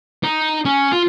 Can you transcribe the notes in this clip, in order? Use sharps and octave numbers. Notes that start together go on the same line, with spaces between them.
D#4
C#4
F4